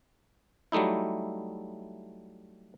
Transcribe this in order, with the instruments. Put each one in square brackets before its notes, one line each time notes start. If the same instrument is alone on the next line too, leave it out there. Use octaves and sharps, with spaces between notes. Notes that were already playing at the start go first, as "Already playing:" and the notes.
[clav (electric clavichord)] F#3 G3 A3 D#4 E4